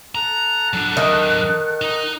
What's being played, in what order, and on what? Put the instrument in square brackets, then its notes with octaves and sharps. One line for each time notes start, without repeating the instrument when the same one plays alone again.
[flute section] A4 F#5 F#6 [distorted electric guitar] A#5
[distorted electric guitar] F#3 D4
[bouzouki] D#3
[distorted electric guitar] D#4